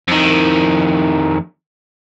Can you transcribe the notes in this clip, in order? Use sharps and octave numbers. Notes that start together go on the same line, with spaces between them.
F2 D#3